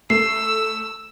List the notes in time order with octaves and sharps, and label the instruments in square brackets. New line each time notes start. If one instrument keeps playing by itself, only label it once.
[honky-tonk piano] A3 [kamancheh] E6 [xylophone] C7